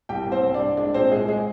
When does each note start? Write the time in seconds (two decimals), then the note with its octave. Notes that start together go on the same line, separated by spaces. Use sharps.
0.09 C2 G4 G5
0.27 C2
0.32 C4 C5
0.44 C2
0.54 D4 D5
0.60 C2
0.77 G#3 D4 D5
0.94 A#2 C4 C5
1.11 C2 G#3 G#4
1.28 G#3 G#4